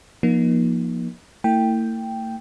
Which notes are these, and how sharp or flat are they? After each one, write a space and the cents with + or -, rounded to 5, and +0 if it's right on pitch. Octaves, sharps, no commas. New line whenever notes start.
F3 +0 A#3 +35 D#4 +0
A3 +45 E4 -15 G5 +0